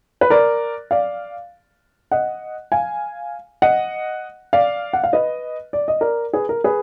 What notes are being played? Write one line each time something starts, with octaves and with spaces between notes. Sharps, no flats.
B4
A#4 D5
D5 F5
D#5 F#5
F5 G#5
D#5 F#5
D5 F5
F#5
F5
B4 D#5
D5
D#5
A#4 D5
G#4 B4
A#4
G#4 B4